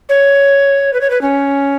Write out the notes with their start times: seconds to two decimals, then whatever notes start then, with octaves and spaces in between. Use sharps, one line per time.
0.09 C#5
0.93 B4
1.01 C#5
1.10 B4
1.21 C#4